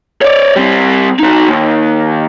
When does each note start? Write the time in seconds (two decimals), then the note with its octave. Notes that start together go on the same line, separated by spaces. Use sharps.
0.22 C#5 D5
0.56 G3 C4
1.19 D#4 F#4
1.48 D#2